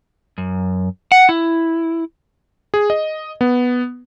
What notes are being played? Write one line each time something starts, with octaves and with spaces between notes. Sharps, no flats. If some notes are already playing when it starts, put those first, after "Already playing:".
F#2
F#5
E4
G#4
D#5
B3